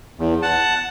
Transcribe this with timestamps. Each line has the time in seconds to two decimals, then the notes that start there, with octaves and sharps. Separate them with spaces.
0.19 E2
0.42 F#5 A5